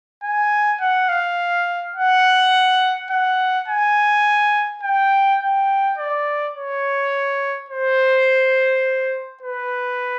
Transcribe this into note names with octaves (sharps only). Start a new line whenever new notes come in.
G#5
F#5
F5
F#5
F#5
G#5
G5
G5
D5
C#5
C5
B4